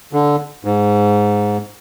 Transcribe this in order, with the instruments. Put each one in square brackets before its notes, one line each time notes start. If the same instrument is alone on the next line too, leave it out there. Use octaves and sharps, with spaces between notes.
[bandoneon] D3
G#2